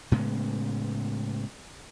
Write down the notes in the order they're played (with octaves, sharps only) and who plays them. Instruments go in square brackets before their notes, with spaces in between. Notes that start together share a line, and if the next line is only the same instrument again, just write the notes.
[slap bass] A2 C#3 G#3 B3